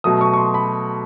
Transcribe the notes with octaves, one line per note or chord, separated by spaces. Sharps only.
B2 F#3 A3 D#6
C#6
C#6
C6
B5